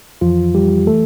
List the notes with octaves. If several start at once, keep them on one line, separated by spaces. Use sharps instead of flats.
F2 E3 F3 F4
G3 G4
E3 A3 A4